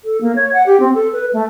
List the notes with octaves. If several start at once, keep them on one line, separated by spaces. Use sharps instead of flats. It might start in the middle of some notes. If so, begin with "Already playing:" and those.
A4
A#3
C#5
F#5
G4
C4
A4
B4
A3